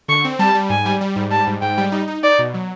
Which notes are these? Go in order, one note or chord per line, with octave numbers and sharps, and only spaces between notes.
D3 C#6
C4
G3 A5
G3
G#2 G#5
G3
G3
G#2
G3 A5
G#2
G#2 G5
G3
D#4
D#4
D#4 D5
B2
F#3